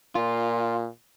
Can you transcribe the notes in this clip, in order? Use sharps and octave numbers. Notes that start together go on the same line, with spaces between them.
A#2 F4